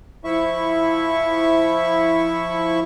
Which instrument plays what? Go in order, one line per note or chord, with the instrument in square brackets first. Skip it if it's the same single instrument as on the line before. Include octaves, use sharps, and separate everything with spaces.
[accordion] F3 E4 E5 C#6